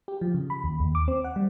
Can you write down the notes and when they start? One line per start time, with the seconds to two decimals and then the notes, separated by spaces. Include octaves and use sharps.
0.08 G4
0.21 F3
0.34 C#3
0.50 B5
0.64 D#2
0.80 D#2
0.95 D6
1.08 C4
1.24 F#5
1.36 G3